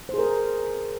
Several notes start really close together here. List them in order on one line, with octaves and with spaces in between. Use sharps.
C5 G#4 A#4